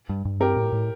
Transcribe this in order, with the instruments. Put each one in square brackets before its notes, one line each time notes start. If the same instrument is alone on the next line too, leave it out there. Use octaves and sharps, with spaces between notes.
[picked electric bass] G2
G2
[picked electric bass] C4 [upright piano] G4 A#4
[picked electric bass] A2
A2